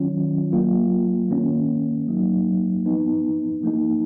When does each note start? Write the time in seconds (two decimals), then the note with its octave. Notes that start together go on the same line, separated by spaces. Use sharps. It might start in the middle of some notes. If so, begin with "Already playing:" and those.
Already playing: D#3 F#3 C#4 F4
0.51 F#3 A#3 F4
1.30 D#3 A#3 C#4
2.08 F#3 A#3 D#4
2.86 F3 B3 D#4
3.63 F3 A#3 D#4